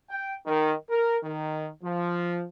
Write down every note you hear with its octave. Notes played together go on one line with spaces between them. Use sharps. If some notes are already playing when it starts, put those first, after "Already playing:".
G5
D#3
A#4
D#3
F3